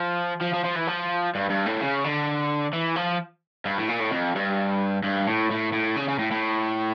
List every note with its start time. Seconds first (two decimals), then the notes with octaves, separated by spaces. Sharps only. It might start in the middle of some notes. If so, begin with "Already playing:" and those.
Already playing: F3
0.41 F3
0.54 F3
0.65 F3
0.76 E3
0.88 F3
1.35 G2
1.50 G2
1.66 A2
1.81 C#3
2.04 D3
2.73 E3
2.96 F3
3.65 G2
3.78 A2
3.88 A#2
4.00 A2
4.11 F2
4.35 G2
5.03 G2
5.27 A2
5.51 A2
5.73 A2
5.96 C#3
6.08 C#3
6.19 A2
6.31 A2